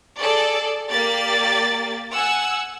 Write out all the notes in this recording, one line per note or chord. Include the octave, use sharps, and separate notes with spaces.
G#4 A4 D5
A#3 G4 D5 A6
F#5 G#5 E6